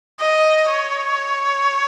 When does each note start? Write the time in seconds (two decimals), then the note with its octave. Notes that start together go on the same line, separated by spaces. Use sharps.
0.20 D#5
0.70 C#5